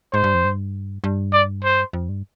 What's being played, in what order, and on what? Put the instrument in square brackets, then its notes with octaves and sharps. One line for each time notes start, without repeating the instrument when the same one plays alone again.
[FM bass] G#2 [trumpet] C5
[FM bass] G2
F2
G2
G2
[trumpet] D5
C5
[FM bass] F2
G2